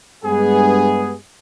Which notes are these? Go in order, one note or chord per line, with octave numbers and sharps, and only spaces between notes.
G2 G#3 B3 G#4